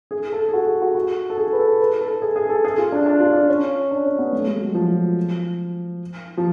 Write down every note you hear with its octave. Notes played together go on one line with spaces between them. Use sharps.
G#4
A4
G#4
F#4
G#4
F#4
F#4
A4
G#4
B4
A4
B4
A4
G#4
G#4
A4
G#4
F4
D4
D4
F4
D4
C#4
D4
C#4
B3
A3
G#3
F#3
F3
F3